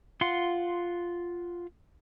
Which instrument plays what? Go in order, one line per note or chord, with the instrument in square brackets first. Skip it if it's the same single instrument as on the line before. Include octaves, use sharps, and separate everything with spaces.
[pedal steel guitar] F4 F#5 C6